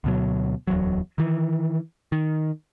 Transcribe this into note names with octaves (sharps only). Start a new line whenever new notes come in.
D2 B2 F#3
D1 E2 F#3
D#3 E3
D#3